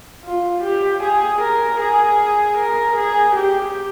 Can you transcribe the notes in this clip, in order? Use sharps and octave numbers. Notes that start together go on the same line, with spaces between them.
F4
G4
G#4
A#4
G#4
A#4
G#4
G4